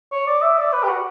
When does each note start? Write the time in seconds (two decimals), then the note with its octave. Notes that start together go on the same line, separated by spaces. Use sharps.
0.12 C#5
0.27 D5
0.42 E5
0.58 D5
0.73 B4
0.84 G4
0.89 F#4